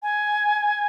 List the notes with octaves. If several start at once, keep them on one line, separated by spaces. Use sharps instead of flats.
G#5